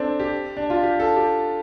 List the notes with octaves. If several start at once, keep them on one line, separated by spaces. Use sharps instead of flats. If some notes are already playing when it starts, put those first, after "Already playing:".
Already playing: C4 D4 A4
G4
D4
F4
G4
A4
G4